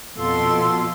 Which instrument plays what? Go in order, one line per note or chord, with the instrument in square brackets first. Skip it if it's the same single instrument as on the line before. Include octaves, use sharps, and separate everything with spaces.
[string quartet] F2 B2 C6 [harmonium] F4 A4